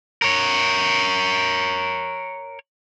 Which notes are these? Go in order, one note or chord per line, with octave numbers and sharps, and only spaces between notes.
A#4 C#5